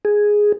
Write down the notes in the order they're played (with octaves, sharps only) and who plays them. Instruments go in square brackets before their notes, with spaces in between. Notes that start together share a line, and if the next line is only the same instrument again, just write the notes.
[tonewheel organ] G#4